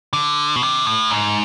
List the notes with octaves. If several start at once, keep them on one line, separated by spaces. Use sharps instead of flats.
D3
B2
C3
A2
G#2